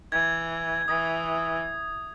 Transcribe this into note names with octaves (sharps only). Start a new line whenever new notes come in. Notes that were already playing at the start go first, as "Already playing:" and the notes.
E3 G#6
E3 D#6